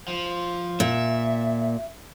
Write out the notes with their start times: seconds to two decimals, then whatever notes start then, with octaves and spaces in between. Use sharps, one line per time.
0.08 F3
0.80 A#2 E5